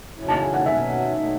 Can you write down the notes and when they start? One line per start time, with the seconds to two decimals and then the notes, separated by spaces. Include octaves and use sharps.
0.17 E2 C#3 F#3 C#4 E4
0.28 A5
0.41 G#5
0.54 F#5
0.66 B2 F#3 C#4 E5
1.15 B2 F#3 A3 D#4